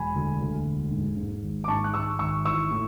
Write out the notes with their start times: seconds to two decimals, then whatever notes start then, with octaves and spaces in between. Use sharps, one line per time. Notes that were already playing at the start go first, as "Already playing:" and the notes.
Already playing: E1 G#5 B5
0.14 D2
0.40 D2
0.66 E1
0.91 G#2
1.17 G#2
1.42 G#1
1.64 D6
1.68 G#2 A5 C#6
1.84 F#6
1.94 G#1 C#6 E6
2.19 G#1 C#6 E6
2.45 E3 C#6 E6
2.71 A2